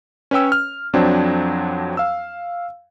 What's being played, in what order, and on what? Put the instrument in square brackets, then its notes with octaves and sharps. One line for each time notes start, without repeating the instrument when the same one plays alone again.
[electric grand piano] C#4 B4 C#5 G5 E6
F6
F2 F#3 C4 D4
F5 E6